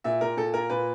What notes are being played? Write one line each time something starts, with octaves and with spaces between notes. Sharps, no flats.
A#2 E5
A#2 A#4
A#2 A4
A#3 A#4
A#2 B4